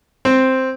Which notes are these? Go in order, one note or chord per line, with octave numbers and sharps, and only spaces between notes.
C4